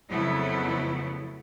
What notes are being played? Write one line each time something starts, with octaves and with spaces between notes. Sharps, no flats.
F2 C#3 F#3 A3 B3 E4